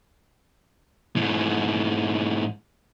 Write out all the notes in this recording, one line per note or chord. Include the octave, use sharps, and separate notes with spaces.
G#2 E3